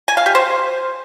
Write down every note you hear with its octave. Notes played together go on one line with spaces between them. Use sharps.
G#5
F5
G4
C5